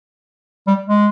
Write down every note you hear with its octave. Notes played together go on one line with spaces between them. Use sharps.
G3
G#3